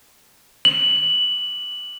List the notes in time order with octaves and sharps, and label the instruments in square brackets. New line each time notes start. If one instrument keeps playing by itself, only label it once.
[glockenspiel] F#7